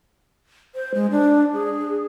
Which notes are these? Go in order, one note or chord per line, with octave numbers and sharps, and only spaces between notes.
C5
G#3
D4
G#4